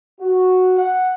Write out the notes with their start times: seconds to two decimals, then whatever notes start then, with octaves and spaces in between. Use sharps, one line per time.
0.20 F#4
0.78 F#5